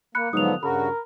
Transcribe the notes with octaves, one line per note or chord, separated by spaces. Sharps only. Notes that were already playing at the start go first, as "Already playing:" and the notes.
A#3 B5 F#6 C#7
G#2 D3 F3 F#3 B3 D#6 F#6 F7
G2 C#3 F#4 A#4 B5